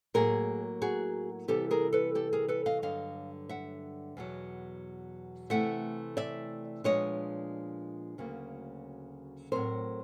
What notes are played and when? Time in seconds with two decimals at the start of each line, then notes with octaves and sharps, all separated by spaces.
0.14 A2 F#3 A#3 G#4 A#4
0.82 F#4 G#4
1.48 C3 E3 G3 B3 G4 A4
1.71 G#4 A#4
1.93 A4 B4
2.15 G4 A4
2.33 G#4 A#4
2.48 A4 B4
2.66 D#5 F5
2.82 G2 D3 F#3 D#5 F5
3.49 E5 F#5
4.17 E2 B2 F#3
5.50 C3 E3 A3 E5 F#5
6.17 D5 E5
6.84 A#2 F3 G#3 B3 D4 C#5 D#5
8.18 D2 C#3 F#3 A#3
9.52 A2 F#3 A3 C4 A#4 C5